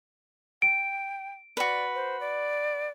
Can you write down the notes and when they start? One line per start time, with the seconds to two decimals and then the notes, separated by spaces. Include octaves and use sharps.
0.62 G5 D7
1.57 F#4 B4 D5
1.95 C5
2.20 D5